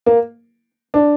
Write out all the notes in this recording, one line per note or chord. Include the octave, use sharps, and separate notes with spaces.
A#3
D4